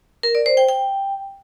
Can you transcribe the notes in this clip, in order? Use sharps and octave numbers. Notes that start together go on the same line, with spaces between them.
A#4
D5
C5
G5
G5